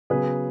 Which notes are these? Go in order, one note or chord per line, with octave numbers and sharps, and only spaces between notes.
C#3 F#3 B3 G#4 B4